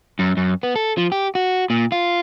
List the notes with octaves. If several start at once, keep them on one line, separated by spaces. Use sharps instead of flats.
F#2
F#2
B3
A4
F3
G4
F#4
A#2
F4